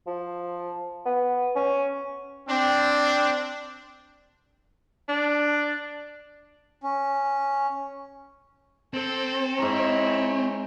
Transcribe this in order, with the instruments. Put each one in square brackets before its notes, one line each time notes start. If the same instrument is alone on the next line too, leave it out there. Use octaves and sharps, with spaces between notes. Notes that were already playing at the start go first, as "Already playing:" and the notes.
[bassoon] F3
B3
C#4
[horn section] C4 D4
[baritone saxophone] D4
[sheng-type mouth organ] C#4
[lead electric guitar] C4 [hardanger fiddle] A4
[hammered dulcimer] G#2 A#5 [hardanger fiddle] E4 C#5